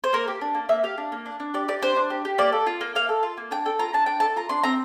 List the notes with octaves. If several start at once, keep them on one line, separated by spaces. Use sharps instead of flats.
C5
A#3 A#4
G4
D4
A#3
A#3 E5
G4 F5
D4
A#3
D4
D4
G4 D5
G4 D5
D4 C5
D4
G4
G4
A#3 D5
A4
F4
A#3
A#3 F5
A4
F4
A#3
D4 G5
A4 G5
F4 A#5
D4 A5
D4 G5
A4 A5
F4 A#5
D4 C6
C4 A#5